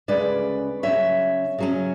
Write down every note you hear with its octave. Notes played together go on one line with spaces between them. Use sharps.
D2 C#3 G#3 C#4 B4 D5
C#3 F#3 C#4 C#5 E5
C#3 F#3 C#4